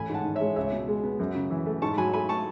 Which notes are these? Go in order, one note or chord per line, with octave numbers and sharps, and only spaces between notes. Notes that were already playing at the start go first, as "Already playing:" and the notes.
Already playing: A1 G#5 B5
G#2
F#5 A5
D#3
G#3 C#5 E5
C#2 C#5 E5
B2
G#3
B3
F#2
C#3
E3
A3
G#2 A5 C#6
F#3 G#5 B5
A3 G#5 B5
A5 C#6